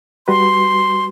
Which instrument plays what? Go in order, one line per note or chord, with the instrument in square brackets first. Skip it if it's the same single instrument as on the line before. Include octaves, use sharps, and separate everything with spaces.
[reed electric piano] G3 F#4 B4 [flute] C6